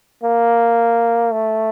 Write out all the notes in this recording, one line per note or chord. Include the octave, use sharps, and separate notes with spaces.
A#3
A3